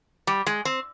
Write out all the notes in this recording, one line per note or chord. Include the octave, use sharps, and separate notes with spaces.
G3
G#3
C4